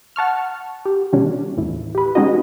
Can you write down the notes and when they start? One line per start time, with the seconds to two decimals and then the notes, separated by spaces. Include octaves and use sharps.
0.16 F#5 A5 C#6 F6
0.86 G4
1.13 B2 D#3 G3 C#4 D4
1.57 D#2 A2 E3
1.95 G4 B4
2.15 G#3 C4 C#4 D#4 F#4 D#5